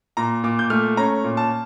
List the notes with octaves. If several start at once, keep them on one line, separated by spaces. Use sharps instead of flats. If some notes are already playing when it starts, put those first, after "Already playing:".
A#2 A#5
A#2 D6
G6
A3 F6
C#4 A#5
A#2
A5